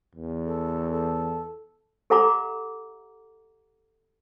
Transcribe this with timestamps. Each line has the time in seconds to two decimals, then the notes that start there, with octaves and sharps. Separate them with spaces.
0.15 E2
0.46 A4
0.91 A4
2.10 G4 A4 E5 F#5 A#5 D6